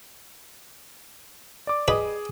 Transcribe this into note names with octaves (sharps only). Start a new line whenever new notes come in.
D5 D6
G3 G#4 B4 D#5 B5 D6